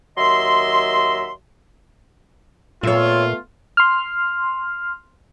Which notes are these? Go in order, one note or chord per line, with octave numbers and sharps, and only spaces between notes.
D#2 F#3 D#5 E5 C6
A#2 A3 B3 F4 C#5 E5
C6 F6